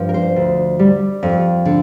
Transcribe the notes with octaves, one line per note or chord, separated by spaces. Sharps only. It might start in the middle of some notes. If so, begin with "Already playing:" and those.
Already playing: G2 F3
A#4
C5
D2
G3
F2
D3